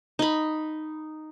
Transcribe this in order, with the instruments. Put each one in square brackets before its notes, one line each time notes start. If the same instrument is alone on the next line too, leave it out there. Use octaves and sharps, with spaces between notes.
[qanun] D#4 B5